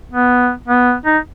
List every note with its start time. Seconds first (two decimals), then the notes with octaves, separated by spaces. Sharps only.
0.11 B3
0.68 B3
1.05 D#4